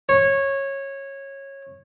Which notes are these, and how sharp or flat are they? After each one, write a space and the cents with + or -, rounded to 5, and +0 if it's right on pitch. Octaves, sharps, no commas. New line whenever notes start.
C#5 -15